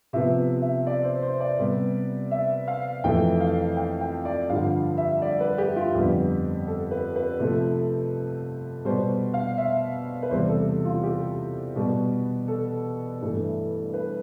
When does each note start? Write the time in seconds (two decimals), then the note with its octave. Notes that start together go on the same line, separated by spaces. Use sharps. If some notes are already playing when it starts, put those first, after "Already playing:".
0.13 C3 F3 B3 E5
0.62 E5
0.87 D5
1.04 C5
1.22 C5
1.41 D5
1.59 C3 G3 B3
2.31 E5
2.68 F5
3.04 F2 E3 A3 G5
3.41 F5
3.77 G5
4.01 G5
4.25 D5
4.49 G2 D3 F3 F5
4.98 E5
5.22 D5
5.40 B4
5.58 G4
5.76 F4
5.95 F2 D3 G3 B3 G4
6.68 A4
6.91 B4
7.16 B4
7.40 C3 F3 A3
8.85 B2 G3 B3 C5
9.34 F5
9.58 E5
10.23 B4
10.31 E2 C3 G3 C5
10.49 A4
10.85 F4
11.03 G4
11.76 B2 G3 B3
12.48 A4
13.21 G2 E3 A3
13.94 B4